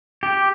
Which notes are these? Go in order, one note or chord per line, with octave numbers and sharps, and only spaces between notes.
G4